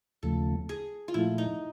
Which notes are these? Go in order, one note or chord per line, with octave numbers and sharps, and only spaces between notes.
D#2 C#3 F3 A3 A4
G#4
F4
A#2 F3 A3 E4
D#4